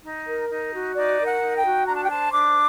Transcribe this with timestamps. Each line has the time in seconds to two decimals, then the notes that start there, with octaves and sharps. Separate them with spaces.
0.04 D#4
0.27 A#4
0.49 D#4
0.73 F#4
0.95 D#4 D5
1.18 A#4
1.25 F#5
1.41 D#4
1.56 G5
1.64 F#4
1.86 D4 A#5
1.94 A5
2.03 G5
2.09 C5 A5
2.32 D4 D6